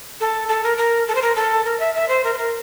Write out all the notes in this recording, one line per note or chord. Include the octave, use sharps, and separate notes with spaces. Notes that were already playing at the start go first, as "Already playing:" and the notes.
A4
A4
A#4
A#4
A4
C5
A#4
A4
A#4
E5
E5
C5
A#4
C5
A#4